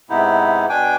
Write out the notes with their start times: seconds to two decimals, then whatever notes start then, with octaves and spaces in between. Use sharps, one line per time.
0.10 G#2 C3 B3 D#4 E4
0.69 B2 D4 G5 G#5 D6